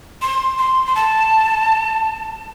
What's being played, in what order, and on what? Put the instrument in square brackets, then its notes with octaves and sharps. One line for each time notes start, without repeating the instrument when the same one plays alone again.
[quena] C6
C6
C6
A5